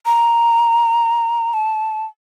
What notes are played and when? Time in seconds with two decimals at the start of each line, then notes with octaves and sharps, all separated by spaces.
0.06 A#5
1.53 A5